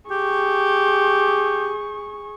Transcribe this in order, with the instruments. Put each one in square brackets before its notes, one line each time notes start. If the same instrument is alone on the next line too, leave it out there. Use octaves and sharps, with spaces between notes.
[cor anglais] G4 [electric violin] G#4 C#6